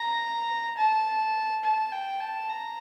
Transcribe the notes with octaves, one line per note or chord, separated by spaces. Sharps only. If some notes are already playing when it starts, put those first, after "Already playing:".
Already playing: A#5
A5
A5
G5
A5
A#5